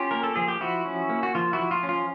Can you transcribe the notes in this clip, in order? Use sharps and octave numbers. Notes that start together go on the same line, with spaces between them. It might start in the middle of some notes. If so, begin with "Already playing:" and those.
Already playing: C#4 F4 G4
A#3 A#4
A4
F3 G#4
G4
F3 E4 F#4
C#4
A#3
F#4
F3 F4
E4 F#4
F3
F4
C#4
F4